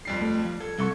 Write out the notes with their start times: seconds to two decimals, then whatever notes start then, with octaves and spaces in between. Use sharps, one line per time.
0.05 F2 G3 C7
0.21 A3
0.46 F3
0.60 A4 G#6
0.79 C2 A4 C#6